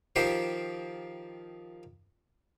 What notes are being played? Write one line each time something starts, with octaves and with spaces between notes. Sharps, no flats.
D#3 F3 G4 C5